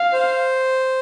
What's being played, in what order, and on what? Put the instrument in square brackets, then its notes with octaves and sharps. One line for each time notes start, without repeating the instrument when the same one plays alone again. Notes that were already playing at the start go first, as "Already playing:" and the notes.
Already playing: [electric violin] F5
[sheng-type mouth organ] C5